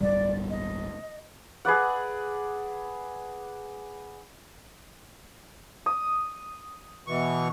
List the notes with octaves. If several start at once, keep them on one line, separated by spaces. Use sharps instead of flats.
D1 G1 G3 D5
D#5
G#4 B4 D5 F#5
D#6
B2 E3 C#6